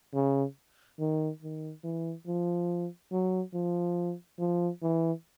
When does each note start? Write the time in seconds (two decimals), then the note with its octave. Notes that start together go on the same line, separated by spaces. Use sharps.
0.14 C#3
1.00 D#3
1.43 D#3
1.84 E3
2.27 F3
3.12 F#3
3.54 F3
4.39 F3
4.82 E3